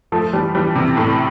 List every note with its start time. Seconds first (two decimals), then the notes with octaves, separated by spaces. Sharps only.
0.12 F3 A3
0.33 E3 G3
0.55 E3 G3
0.75 C3 E3
0.97 A2 C3